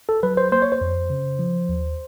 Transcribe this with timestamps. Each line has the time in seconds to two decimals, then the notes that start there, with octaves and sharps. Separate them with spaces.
0.09 A4
0.23 F#3 B4
0.37 C5
0.52 A#3 C5
0.62 C#5
0.72 C5
0.81 F2
1.10 C#3
1.39 F3
1.69 D#2